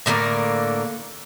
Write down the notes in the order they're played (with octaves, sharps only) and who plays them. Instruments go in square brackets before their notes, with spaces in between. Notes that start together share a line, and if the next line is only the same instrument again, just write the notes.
[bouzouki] A2 D3 A3 A#3